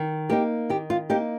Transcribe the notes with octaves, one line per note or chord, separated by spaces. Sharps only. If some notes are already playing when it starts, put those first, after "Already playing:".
Already playing: D#3
A#3 D#4 G4
D#3 G4
F4
A#3 D#4 G4